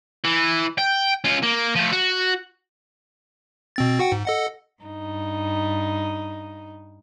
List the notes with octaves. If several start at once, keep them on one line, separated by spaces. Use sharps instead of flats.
E3
G5
C#4 F4
A#3
F3 A3
F#4
B2 C4 A6
F#4 F#5 G5
G#2
A4 D#5 F#5
G2 D#4